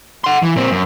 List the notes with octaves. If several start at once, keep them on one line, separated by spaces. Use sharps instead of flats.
F#5 C6
E3
A#2 C4
F#2